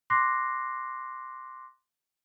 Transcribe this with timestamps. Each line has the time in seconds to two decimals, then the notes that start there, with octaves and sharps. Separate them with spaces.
0.10 C6 D6 F#6 A#6 C7